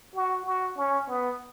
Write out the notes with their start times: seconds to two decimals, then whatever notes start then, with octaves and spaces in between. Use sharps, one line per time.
0.16 F#4
0.46 F#4
0.78 C#4
1.09 B3